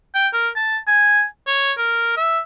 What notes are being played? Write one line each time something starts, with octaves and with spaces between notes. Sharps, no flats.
G5
A#4
A5
G#5
C#5
A#4
E5